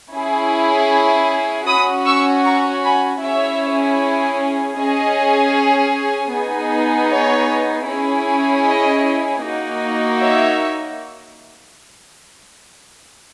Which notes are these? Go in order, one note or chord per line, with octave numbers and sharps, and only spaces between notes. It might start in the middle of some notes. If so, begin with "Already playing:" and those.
C#4 E4 G#4
C#4 F#4 B5 D#6
C#6 E6
A#5 C#6
G#5 B5
C#4 E4 G#4 C#5 E5
C#4 G#4 D#5
B3 D#4 G#4
C#5
C#4 E4 G#4
D#5
A#3 D#4 F#4
C#5 E5